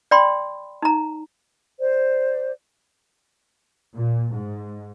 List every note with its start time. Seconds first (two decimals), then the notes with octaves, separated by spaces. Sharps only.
0.11 D5 G5 B5 C6
0.82 D#4 A#5
1.79 C5 D5
3.92 A#2
4.31 G#2